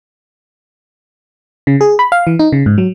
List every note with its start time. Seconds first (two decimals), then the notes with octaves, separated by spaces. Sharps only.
1.67 C#3
1.81 G#4
1.99 B5
2.12 F5
2.27 E3
2.39 D#4
2.52 C#3
2.66 G#2
2.78 F#3